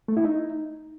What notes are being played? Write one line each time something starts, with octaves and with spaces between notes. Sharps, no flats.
A3
E4
D#4